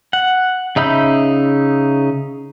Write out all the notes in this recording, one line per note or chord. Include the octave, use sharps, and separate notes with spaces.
F#5
C#3 D#4 E5 B5 G6